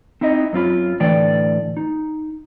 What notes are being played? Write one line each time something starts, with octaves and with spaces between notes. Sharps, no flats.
C4 D#4 E4 D#5
F#2 C4 F4 B5
A2 D3 E3 D5 G5
D#4